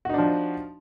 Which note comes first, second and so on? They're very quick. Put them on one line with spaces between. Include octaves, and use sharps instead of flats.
F#4 D#4 D4 F3